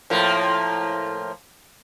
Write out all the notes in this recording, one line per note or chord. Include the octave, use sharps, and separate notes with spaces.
A2 F3 A#3